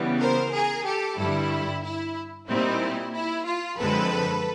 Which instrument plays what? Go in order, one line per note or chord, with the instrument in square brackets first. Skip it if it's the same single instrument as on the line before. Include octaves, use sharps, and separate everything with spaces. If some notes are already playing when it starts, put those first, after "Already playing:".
Already playing: [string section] C#3 E3 G3 B3
A#4 C5
G#4 A#4
G4 A4
G2 D3 G3 E4
E4
A#2 G3 C4 D#4 E4
E4
F4
F#2 D3 F3 G#3 C4 A4 B4